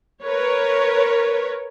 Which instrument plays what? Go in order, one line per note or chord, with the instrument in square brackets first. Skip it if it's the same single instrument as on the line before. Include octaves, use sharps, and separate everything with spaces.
[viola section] A#4 B4 C#5